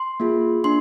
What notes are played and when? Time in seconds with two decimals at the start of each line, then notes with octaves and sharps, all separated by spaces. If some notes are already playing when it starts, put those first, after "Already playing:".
Already playing: C6
0.20 A#3 F4 G#4
0.64 A#3 D4 C6